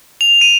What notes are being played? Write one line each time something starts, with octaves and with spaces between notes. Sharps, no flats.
F7
D#7